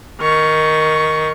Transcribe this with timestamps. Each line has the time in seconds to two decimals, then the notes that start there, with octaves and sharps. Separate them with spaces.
0.20 D#3 C#6